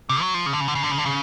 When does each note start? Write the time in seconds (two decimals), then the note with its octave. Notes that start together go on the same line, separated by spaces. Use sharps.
0.09 C3
0.21 F#3
0.34 F3
0.46 C#3
0.53 D3
0.60 C#3
0.68 D3
0.75 C#3
0.83 D3
0.91 C#3
0.98 D3
1.06 C#3